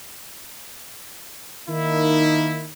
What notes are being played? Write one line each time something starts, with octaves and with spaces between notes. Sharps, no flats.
D#3 A#3 D#4 E4